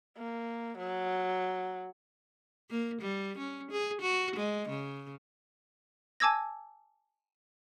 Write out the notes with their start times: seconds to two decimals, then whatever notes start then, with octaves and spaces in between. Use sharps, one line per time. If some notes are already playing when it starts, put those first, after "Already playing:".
0.18 A#3
0.78 F#3
2.70 A#3
3.02 G3
3.38 C#4
3.71 G#4
4.02 F#4
4.36 G#3
4.69 C#3
6.20 G#5 A5 D6 E6 G#6 A#6